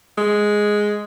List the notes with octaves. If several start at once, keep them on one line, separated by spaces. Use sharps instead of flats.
G#3